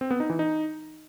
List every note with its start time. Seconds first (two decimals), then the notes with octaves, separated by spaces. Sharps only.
0.01 C4
0.11 B3
0.20 D#4
0.30 E3
0.39 D#4